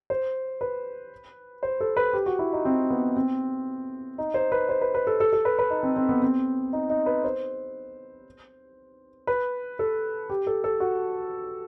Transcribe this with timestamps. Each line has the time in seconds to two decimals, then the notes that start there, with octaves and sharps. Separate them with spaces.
0.10 C5
0.61 B4
1.63 C5
1.81 A4
1.97 B4
2.13 G4
2.26 F#4
2.39 E4
2.53 D#4
2.65 C4
2.90 B3
3.17 C4
4.18 D#4
4.34 C5
4.52 B4
4.69 C5
4.82 B4
4.94 B4
5.07 A4
5.20 A4
5.33 A4
5.45 B4
5.59 B4
5.70 D#4
5.83 C4
5.96 C4
6.09 B3
6.22 C4
6.73 D#4
6.90 D#4
7.06 B4
7.24 C5
9.27 B4
9.79 A4
10.30 G4
10.47 A4
10.64 A4
10.80 F#4